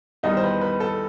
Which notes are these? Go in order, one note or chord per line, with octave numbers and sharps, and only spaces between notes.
E2 D#3 G3 D#5
C5
B4
B4
A4